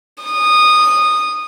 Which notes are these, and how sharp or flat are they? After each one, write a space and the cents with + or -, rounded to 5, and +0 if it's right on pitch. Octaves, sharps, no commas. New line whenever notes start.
D#6 -15